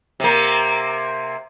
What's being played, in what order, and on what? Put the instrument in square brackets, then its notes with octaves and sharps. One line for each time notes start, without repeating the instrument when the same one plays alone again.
[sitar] C3 A#3